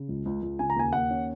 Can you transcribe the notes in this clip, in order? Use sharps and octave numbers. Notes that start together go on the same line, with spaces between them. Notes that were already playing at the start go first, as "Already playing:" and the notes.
Already playing: C#3
C#2
C#2
C#2
C#3 G#5
A#5
D#2 G#5
D#2 F#5
C#4